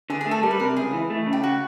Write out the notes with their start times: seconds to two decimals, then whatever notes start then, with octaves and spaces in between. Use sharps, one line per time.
0.10 D3 G#4
0.21 G#4
0.26 A3
0.31 A4
0.43 G3 A#4
0.51 B4
0.60 C3 A#4
0.76 C#2 G#4
0.93 E3
1.10 A3
1.26 C#3
1.33 G4
1.44 F#4